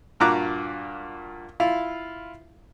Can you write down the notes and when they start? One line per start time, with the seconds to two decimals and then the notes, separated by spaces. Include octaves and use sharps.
0.20 G2 A#2 F#4 A#5 D6 F#6
1.60 E4 F4 F5